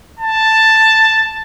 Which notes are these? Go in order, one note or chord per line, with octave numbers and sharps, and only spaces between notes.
A5